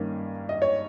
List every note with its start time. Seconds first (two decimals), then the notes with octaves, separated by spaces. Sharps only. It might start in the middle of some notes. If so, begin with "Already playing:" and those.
Already playing: G2 D#3 A#3 C#4
0.49 D#5
0.62 C#5